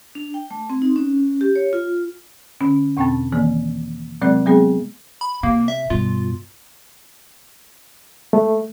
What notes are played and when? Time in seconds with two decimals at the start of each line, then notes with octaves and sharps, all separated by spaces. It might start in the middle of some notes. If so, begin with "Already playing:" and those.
0.15 D4
0.34 G5
0.51 A3
0.70 C4
0.82 D#4
0.96 C#4
1.41 G4
1.56 C#5
1.73 F4
2.61 D3 C#4
2.97 E2 B2 C4 G5 A5 A6
3.32 D#3 E3 A#3
4.21 C3 F#3 G#3 C4 D5 F#6
4.46 F#3 G#3 A3 B3 C4 G#4
5.21 B5
5.43 C3 A#3
5.68 E5
5.90 G2 B2 F4
8.33 A3